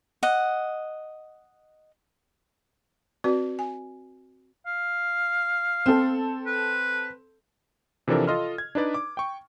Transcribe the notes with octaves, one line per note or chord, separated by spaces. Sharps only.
D#5 F#5
C4 F#4 B4 D5
G#5
F5
C4 A4
B4
C3 E3 F3 D4 A4 A#4
F4 A4 D#5 C6 F6
G#6
D4 D#4 B4 D5
D6
G5 C#6